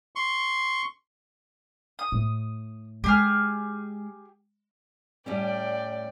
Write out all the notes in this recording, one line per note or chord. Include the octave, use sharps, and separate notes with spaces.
C6 C#6
D#6
A2 A3
G#3 G4 G#4 F6
A2 G3 C#4 D5 G5